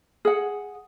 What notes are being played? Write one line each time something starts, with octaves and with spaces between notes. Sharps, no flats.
G#4 F#5